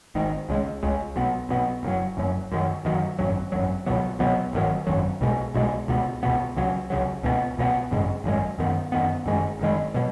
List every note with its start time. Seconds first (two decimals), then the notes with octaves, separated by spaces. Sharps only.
0.15 G#1 G#2 D#3
0.49 C#2 C#3 G#3
0.83 C#2 C#3 G#3
1.16 B1 B2 B3
1.49 B1 B2 B3
1.83 F#1 F#2 F#3
2.17 F#1 F#2 F#3
2.52 F#2 D#3 F#3
2.85 F#2 D#3 F#3
3.19 G#1 F#2 F#3
3.52 G#1 F#2 F#3
3.86 C#2 B2 F#3 B3
4.19 C#2 B2 F#3 B3
4.53 G#1 F#2 D#3 F#3
4.87 G#1 F#2 D#3 F#3
5.21 B1 B2 G#3
5.54 B1 B2 G#3
5.88 C#2 B2 B3
6.23 C#2 B2 B3
6.56 C#2 C#3 F#3
6.90 C#2 C#3 F#3
7.23 C#2 B2 G#3 B3
7.57 C#2 B2 G#3 B3
7.91 G#1 F#2 C#3 G#3
8.24 G#1 F#2 C#3 G#3
8.59 F#2 D#3 B3
8.92 F#2 D#3 B3
9.26 F#1 F#2 D#3 G#3
9.59 F#1 F#2 D#3 G#3
9.94 B2 F#3